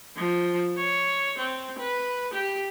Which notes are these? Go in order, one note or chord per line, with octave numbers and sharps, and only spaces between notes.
F3
C#5
C4
B4
G4